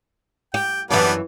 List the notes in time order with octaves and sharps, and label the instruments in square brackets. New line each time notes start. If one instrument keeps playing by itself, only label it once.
[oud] G4 [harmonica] G5
[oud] F#2 E3 [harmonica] G3 B3 D4